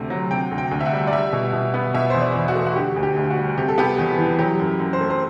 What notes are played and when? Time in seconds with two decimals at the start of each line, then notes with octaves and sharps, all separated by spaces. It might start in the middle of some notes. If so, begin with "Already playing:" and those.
Already playing: D2 C3 A3
0.10 F#3
0.31 C3 G5
0.51 D2
0.58 G5
0.71 D2
0.81 E5
0.85 F#5
0.93 G3
1.07 D5
1.12 G3 E5
1.33 B2
1.53 B2
1.74 B3
1.94 B2 E5
2.10 E2 C5
2.21 D5
2.35 E2
2.48 F#4
2.55 A3
2.67 F#4
2.76 D3 G4
2.96 D2
3.03 G4
3.16 D2
3.30 F#4
3.37 G3
3.57 C3 G4
3.68 A4
3.78 B3 G4
3.98 E2
4.18 E3
4.39 F#3 G4
4.60 F#2
4.80 F#2
4.93 C5
5.00 A3
5.10 C5